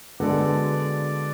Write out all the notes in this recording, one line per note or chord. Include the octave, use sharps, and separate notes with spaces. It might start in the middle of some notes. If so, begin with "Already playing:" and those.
D3 G#3 B3 F#4 A4 D5